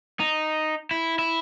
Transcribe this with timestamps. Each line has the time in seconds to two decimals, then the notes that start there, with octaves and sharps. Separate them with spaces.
0.20 D#4
0.91 E4
1.19 E4